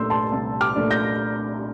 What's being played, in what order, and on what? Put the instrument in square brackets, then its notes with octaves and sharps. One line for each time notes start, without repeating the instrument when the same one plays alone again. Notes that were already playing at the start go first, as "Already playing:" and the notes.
Already playing: [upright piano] C2 A#2 A3 D4 C6 E6 G6
A5 C6
C2
D6 F6
A#2 A3 D4
G6 A#6